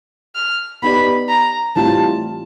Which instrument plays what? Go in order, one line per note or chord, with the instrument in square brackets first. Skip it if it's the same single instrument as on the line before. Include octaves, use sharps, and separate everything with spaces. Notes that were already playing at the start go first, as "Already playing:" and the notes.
[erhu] F6
[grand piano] B3 D#4 G4 B4 D5 [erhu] B5
[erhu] A#5
[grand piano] A2 E3 G3 C4 F4 [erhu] A5